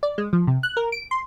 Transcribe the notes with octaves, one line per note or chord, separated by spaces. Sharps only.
D5
G#3
F3
C3
F#6
A#4
D7
C6